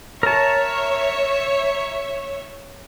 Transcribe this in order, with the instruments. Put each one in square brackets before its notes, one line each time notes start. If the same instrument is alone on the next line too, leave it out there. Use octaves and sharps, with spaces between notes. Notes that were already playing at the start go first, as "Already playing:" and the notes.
[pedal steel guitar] A#4 A5 [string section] C#5 E5